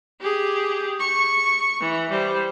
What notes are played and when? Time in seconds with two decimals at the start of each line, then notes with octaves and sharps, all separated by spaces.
0.20 G4 G#4
1.00 C#6
1.80 E3
2.10 G3 C5